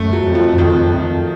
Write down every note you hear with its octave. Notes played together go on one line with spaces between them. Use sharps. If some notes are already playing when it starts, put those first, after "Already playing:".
Already playing: F#2 A3
F#3
F2
F3
F2 D#3